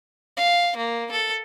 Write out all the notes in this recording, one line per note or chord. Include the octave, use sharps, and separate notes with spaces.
F5
A#3
A4